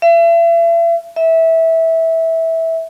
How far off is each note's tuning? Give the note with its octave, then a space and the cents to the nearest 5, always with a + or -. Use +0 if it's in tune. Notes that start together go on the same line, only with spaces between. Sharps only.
E5 +40
E5 -15